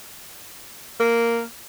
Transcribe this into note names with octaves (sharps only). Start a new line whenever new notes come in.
A#3